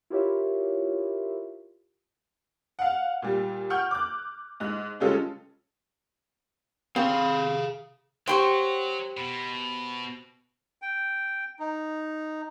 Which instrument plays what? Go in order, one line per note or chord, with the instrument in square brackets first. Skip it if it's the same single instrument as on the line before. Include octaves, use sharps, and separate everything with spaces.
[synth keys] E4 F4 G4 A#4 C#5 E5
[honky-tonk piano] F5 F#5
A#2 G3
F#5 G5 C#6 F6 G6
D6 F#6
G#2 F#6
C#3 G3 G#3 C#4 F4 A4
[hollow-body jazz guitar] C4 [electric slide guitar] G#4 F5
[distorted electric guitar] F#3 [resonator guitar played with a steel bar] G4 C5 [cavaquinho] G5 C6 C#6
[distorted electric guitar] B2
[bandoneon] G5
D#4